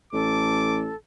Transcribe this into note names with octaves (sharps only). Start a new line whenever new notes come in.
A1 A4 D6